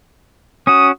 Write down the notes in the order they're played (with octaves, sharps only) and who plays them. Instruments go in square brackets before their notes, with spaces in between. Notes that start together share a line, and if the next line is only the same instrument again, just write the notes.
[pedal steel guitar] C#4 F#4 [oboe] D#6